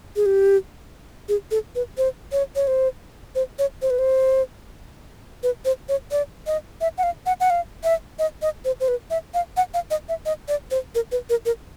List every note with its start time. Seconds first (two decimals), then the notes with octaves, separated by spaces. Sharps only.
0.16 G#4
0.26 G4
1.29 G#4
1.51 A4
1.75 B4
1.98 C5
2.32 C#5
2.56 C#5
2.67 C5
3.35 C5
3.59 C#5
3.82 C5
3.90 B4
3.99 C5
5.43 B4
5.65 C5
5.89 C#5
6.11 D5
6.47 D#5
6.81 E5
6.98 F#5
7.03 F5
7.26 F#5
7.40 F#5
7.50 F5
7.84 E5
8.19 D#5
8.42 D#5
8.65 C5
8.80 C5
8.88 B4
9.10 E5
9.34 F5
9.57 F#5
9.74 F5
9.91 D#5
10.09 E5
10.26 D#5
10.48 D5
10.71 C5
10.95 A#4
11.12 B4
11.30 A#4
11.46 A#4